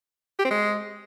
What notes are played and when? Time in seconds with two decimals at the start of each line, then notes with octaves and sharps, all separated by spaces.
0.39 G4
0.45 C4
0.51 G#3